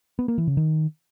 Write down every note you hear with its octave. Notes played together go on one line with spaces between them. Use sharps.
B3
A#3
E3
C#3
D#3